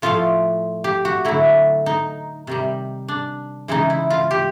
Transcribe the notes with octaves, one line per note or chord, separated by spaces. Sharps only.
A2 F3 A3 F4
G4
F#4
D3 F#3 A3 E4
D#4
C3 D#3 G3
D4
C#3 E3 G#3 D#4
E4
F4
G4